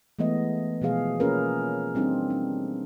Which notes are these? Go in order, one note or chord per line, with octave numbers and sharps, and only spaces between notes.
E3 G#3 A3 B3 D#5
B2 F3 G#3 G#4 F5
A#3 C#4 F4 G#4 A#4 B4
G3 C4 D4 D#4
D4